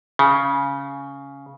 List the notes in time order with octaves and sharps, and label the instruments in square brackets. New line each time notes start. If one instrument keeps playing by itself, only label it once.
[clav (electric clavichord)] C#3